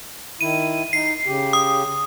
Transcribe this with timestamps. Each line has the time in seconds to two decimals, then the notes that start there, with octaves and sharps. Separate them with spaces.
0.41 D#3 E4 D#7
0.93 D#4 C7
1.26 C#3 G4
1.53 D#6